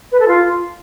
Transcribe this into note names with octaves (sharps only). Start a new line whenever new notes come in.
B4
A4
F4